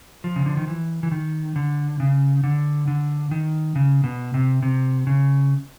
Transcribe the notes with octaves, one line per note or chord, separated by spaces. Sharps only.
F3
C#3
D3
D#3
E3
E3
D#3
D3
C#3
D3
D3
D#3
C#3
B2
C3
C3
C#3